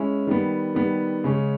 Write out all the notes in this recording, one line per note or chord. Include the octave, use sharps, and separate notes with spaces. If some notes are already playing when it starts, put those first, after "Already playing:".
Already playing: G#3 C#4 E4
D#3 G3 B3
D#3 G3 B3
C#3 G#3 C#4